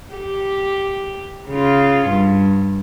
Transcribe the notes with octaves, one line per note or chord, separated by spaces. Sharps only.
G4
C#3 F4
G2